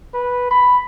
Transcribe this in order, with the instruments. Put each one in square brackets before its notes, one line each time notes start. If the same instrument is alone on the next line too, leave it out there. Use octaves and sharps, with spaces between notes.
[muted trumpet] B4
B5